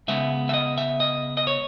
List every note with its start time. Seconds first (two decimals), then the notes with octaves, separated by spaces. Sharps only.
0.08 C#3 G#3 B3 E5
0.49 E5
0.54 D#5
0.78 E5
1.00 D#5
1.37 D#5
1.47 C#5